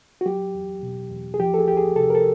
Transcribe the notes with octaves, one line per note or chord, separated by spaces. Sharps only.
F#4
F#3 G4
E2
B2
E2
G#4
F3 G4
A4
G#4
C#2 G4
G#4
C3 A4
A#4
A4